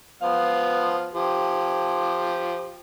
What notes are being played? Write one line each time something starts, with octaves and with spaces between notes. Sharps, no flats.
F3 B3 F5
F3 G4